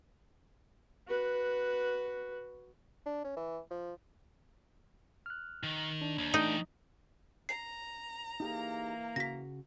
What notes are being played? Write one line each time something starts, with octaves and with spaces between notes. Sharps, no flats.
F#4 B4
D4
C#4
E3
F3
F6 F#6
D#3
D4
D#2
E3 A3 D4 D#4 G5
A#5 C7
E3 A#3 D#4 G4 G#4
C#3 F#4 A#6 B6